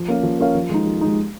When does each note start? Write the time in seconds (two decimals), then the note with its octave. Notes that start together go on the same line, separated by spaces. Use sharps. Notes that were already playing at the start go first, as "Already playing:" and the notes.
Already playing: F3
0.08 A#3 C#4 A#4 F5
0.23 F3
0.39 A#3 C#4 A#4 F5
0.55 F3
0.70 G#3 D#4
0.86 F3
1.01 G#3 D#4